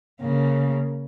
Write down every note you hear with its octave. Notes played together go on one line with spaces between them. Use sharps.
C#3 A#3